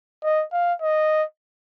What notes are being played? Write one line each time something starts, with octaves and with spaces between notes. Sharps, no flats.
D#5
F5
D#5